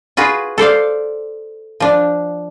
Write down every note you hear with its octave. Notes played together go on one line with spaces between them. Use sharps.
F4 F#4 G#4 B4
A4 C5 D5 F5
F3 D4